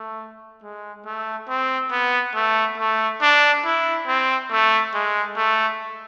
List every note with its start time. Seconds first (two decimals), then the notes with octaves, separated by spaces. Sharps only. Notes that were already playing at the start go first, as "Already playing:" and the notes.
Already playing: A3
0.63 G#3
1.06 A3
1.49 C4
1.91 B3
2.35 A3
2.78 A3
3.22 D4
3.65 E4
4.07 C4
4.51 A3
4.94 G#3
5.37 A3